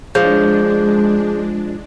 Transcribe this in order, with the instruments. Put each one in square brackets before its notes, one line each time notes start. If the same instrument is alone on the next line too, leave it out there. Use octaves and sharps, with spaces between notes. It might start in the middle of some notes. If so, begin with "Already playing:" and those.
[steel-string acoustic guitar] F3 [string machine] G#3 D4 [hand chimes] G#4 G6